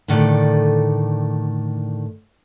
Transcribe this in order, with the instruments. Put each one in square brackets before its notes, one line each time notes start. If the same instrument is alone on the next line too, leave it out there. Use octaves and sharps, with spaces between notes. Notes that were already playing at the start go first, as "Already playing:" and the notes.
[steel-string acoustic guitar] A2 D3 D#3 A3 D5